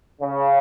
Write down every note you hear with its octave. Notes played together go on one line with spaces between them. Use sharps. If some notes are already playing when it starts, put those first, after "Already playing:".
C#3